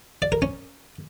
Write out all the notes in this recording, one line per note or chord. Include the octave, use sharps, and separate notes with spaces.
D5
A#4
C#4